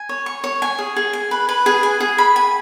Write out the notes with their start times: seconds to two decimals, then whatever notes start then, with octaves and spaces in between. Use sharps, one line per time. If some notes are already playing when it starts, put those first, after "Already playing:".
Already playing: G#5
0.09 C#5
0.26 C#6
0.44 C#5
0.62 G#5
0.79 G#4
0.96 G#4
1.13 G#5
1.31 B4
1.49 B4
1.66 G#4
1.83 G#5
2.00 G#4
2.18 B5
2.36 G#5